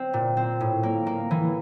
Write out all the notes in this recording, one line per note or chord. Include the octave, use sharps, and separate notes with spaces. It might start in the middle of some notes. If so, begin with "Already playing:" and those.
Already playing: C4
A#2
C4
A2
A#3
A#3
E3